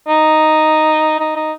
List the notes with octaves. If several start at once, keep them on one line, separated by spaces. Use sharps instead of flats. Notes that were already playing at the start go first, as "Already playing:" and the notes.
D#4
D#4
D#4